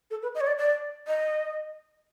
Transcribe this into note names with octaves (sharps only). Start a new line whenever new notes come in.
A4
B4
D#5
C#5
D5
D5
D#5